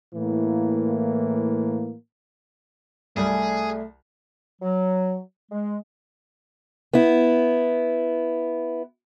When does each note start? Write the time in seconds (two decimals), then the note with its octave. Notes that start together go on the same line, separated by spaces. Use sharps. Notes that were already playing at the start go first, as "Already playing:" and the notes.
0.14 A2 E3 A#3
3.17 C2 G3 A3 G#4
4.62 F#3
5.50 G#3
6.93 B3 E4